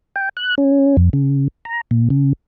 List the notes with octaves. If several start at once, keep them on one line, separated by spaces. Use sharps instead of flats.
G5
F#6
C#4
F2
C#3
A#5
A#2
C#3